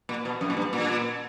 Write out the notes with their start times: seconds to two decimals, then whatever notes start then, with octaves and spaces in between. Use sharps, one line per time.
0.09 A#2
0.25 B2
0.41 F#2
0.50 A#2
0.57 G2
0.73 A#2